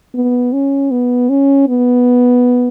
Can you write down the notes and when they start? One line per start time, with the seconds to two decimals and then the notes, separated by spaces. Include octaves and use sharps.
0.14 B3
0.53 C#4
0.91 B3
1.30 C#4
1.68 B3